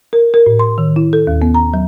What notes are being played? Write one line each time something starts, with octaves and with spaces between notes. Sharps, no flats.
A#4
A#4
A2
C6
D#3
E4
A4
D#2
B3
A#5
F#3